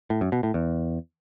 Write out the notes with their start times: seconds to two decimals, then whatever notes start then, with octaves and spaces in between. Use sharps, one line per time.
0.10 A2
0.21 F#2
0.32 B2
0.43 A2
0.54 E2